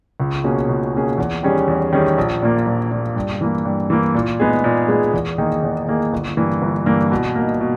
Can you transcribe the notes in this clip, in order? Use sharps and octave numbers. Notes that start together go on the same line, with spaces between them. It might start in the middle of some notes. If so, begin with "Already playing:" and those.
C#2
B2 A#3 C#4 G#4
C#2
B2 A#3 C#4 G#4
E2
D#3 G3 C#4 G#4
E2
D#3 G3 C#4 G#4
A#1
A#2 A#3
A#1
A#2 A#3
G2
E3 A#3
G2
E3 A#3
A#2
G#3 B3 D#4 G#4
A#2
G#3 B3 D#4 G#4
E2
D#3 A#3 D#4 G#4
E2
D#3 A#3 D#4 G#4
G1
G2 E3 A#3
G1
G2 E3 A#3
B2
A#3 D#4
B2